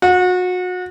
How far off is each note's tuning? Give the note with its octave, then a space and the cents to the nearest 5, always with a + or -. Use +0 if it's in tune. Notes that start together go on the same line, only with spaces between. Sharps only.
F#4 -30